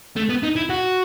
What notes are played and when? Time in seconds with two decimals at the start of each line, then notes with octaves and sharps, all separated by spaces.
0.16 A3
0.29 B3
0.43 D#4
0.56 E4
0.69 F#4